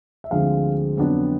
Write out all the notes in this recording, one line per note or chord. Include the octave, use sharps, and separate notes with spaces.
E5
D2 D3 F3 G#3 C4 F5
F2 D3 F#3 B3 D4